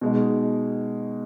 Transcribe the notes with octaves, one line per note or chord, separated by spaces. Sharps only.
B2 G#3 D#4